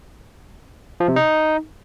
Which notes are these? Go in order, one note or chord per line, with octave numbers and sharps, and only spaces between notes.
F3
C3
D#4